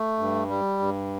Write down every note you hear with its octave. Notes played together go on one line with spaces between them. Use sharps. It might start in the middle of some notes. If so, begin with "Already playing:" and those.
Already playing: A3
G2
G3
G2